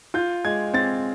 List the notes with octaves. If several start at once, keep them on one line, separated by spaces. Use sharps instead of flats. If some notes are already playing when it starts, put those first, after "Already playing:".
F4 G6
G#3 G#6
C4 A6